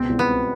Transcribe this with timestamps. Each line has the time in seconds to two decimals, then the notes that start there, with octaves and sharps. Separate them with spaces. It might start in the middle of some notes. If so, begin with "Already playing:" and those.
Already playing: C#2 B2 C4
0.09 C2
0.19 B3
0.29 C4